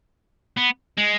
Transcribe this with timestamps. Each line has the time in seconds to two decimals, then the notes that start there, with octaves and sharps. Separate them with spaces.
0.58 B3
0.98 G#3